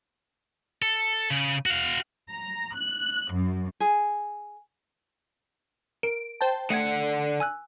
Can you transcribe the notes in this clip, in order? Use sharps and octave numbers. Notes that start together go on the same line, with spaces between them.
A4
C#3
F#4 F5
A#5
F#6
F#2
G#4
A#4 D7
C5 G5 A5
D3 A3 F#5 G#6
G#5 E6 F#6